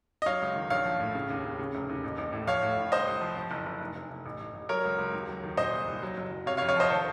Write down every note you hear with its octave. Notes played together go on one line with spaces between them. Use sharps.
D#5
F#3 C#5 F5
C#2
D#3
A#1 C#5 F5
F3
A2
C#3
D#2
C#3
C#3
F1
D#2
A1
A1
A2
F3 C#5 F5
A2
A2
C2 C5 D#5
C2
F3
F3
F#1
F#1
F1
F1
F1
A1
A1
A1
F#3 A#4 C#5
C#2
C#2
D#2
F#3
D#3
A#2 C5 D#5
C2
C2
F#3
F#1
F#3
C3 C#5 F5
C#5 F5
F2
C#5 F5
F3 C5 D#5
D#3 A4 C5